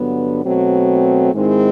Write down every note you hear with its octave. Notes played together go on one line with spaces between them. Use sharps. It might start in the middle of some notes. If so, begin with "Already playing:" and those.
Already playing: G2 D3 F#3 B3
B2 F#3 A3 C4
G#2 D#3 G#3 C4 E4